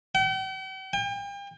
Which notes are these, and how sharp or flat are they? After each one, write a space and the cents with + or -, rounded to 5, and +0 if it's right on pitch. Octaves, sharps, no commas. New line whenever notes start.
G5 -45
G5 +40